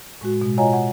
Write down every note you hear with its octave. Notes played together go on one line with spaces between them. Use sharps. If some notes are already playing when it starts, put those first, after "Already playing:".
A2 G#3 F#4
B2 G#3
F4 C#5 D#5 F#5 G#5 A#5
F#5